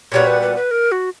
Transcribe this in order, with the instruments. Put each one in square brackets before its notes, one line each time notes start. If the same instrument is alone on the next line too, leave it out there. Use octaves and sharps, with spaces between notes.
[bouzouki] A#2 G3 B3 F#4 [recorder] C#5
[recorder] B4
B4
B4
A#4
F#4